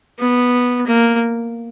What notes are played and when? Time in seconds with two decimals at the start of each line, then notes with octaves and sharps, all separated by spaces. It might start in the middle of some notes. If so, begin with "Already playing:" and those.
0.19 B3
0.87 A#3